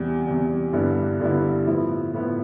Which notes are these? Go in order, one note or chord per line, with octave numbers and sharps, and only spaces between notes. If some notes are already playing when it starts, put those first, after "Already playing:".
Already playing: E2 C3 G3
E2 C3 G3
G2 D3 G3 B3 E4
G2 D3 G3 B3 E4
A2 F3 B3 E4
A2 F3 B3 E4